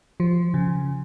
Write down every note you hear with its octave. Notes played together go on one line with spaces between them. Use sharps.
F3
C#3